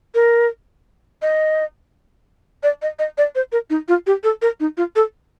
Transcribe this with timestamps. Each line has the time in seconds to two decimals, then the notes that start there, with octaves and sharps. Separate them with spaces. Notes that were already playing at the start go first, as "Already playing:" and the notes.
0.15 A#4
1.22 D#5
2.63 D5
2.82 D#5
2.99 D#5
3.18 D5
3.35 C5
3.52 A#4
3.70 D#4
3.88 F4
4.07 G4
4.24 A4
4.42 A#4
4.60 D#4
4.77 F4
4.96 A4